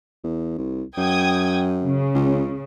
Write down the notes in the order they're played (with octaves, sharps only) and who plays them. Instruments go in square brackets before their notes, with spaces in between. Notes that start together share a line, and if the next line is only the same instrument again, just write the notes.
[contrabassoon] E2
C2
[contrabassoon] F#2 [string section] G5 D#6 G#6
[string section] C#3
[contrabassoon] C#2